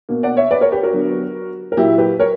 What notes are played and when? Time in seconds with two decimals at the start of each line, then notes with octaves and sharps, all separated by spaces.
0.09 B2 A#3
0.23 D5 F#5
0.37 C#5 E5
0.51 B4 D5
0.61 A#4 C#5
0.72 G4 B4
0.83 F#4 A#4
0.93 D3 F#3 B3
1.72 A#4
1.77 A#2 F#3 A#3 E4 G4
1.98 G4 B4
2.19 A#4 C#5